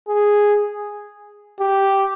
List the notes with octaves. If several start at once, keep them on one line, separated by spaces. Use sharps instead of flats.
G#4
G4